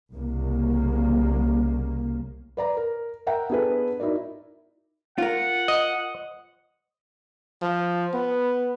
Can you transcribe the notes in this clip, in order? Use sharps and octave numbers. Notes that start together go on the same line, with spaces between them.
C2 C#3 A#3
B4 D5 A#5
A#4
A#4 E5 F#5 G5 A#5
B3 D4 E4 G#4 A4 B4
D#4 E4 F#4 A#4 D5
F4 A#4 F#5
D#5
F3
B3